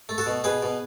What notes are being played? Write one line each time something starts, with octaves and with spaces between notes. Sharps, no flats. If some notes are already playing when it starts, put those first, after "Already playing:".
A3
F#4 A4
B2
B2 G#4 B4
B2